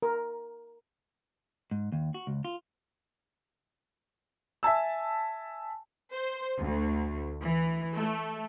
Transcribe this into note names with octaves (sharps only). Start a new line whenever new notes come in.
A#4
G#2
D#2
F#4
C#2
F4
E5 G#5 A5 E6
C5
D2
E3
A3